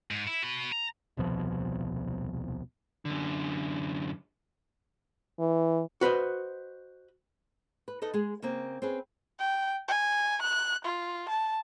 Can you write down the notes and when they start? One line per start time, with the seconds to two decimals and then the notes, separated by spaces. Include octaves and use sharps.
0.11 G#2
0.27 E4
0.43 F#4 B5
0.72 A#5
1.17 D#1 C2 B2 F3
3.05 F#2 D3
5.39 E3
6.01 F#4 B4 C5 D#5
7.88 B4
8.02 D#4 A4 B4 D#5
8.14 G#3 G#4
8.42 C#3 A#3 C4
8.82 C4 C#4 G#4 B4
9.39 G5
9.88 G#5
10.42 F#6
10.85 F4
11.29 A5